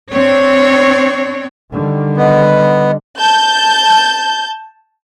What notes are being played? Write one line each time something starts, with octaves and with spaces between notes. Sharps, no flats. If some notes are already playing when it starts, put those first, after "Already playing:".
C4 D4 C#5
D3 D#3 G3
B3 D#5
A5 G6